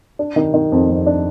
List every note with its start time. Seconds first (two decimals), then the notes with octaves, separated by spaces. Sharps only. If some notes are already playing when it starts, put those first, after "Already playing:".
0.19 D4
0.36 D#3
0.54 D#3
0.72 F2
0.89 F2
1.07 D4